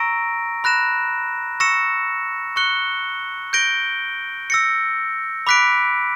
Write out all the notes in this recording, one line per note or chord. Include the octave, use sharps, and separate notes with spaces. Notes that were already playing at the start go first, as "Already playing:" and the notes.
Already playing: A#5 C#6 E6 A#6 D7
B5 F#6 A#6 E7
C#6 E6 A#6 C#7 E7
C#6 F#6 C#7 G7
G6 A#6 D7 G7
E6 A#6 C#7
B5 D6 F#6 B6 D7